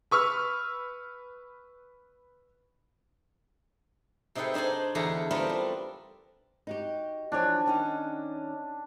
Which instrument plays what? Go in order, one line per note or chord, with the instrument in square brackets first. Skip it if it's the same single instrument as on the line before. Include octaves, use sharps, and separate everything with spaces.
[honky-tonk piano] B4 C#6 E6 F6
[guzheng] C3 D#4 G#4 A4 B4 G5
D4 D#4 C5 D5 G#5
E2 D3 A3 G4 G#4 A#5
G3 A3 B3 C4 F4 A#4
D4
[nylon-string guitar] D#4 F#4 G4
[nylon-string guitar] E3 F3 C#5 [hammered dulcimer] D4
[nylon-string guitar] D#3 C#4 D#4